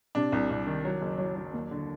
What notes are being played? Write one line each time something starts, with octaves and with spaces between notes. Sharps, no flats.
C3 D4
C2
C2
D#3
F#3
F#1
F#3
F#3
D#2
D3